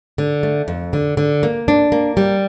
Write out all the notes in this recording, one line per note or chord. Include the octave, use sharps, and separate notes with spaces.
D3
A3
F2
D3
D3
A#3
D4
A#3
G3